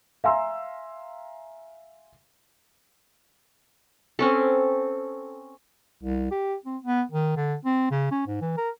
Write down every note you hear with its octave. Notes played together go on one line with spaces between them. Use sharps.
E5 F5 G#5 A#5 C6 E6
C4 C#4 A4
C2
G4
C4
B3
D#3
D3
C4
C#3
C#4
G#2
E3
A#4